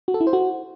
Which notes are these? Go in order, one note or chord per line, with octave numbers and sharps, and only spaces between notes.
F#4
A4
E4
C5
F#4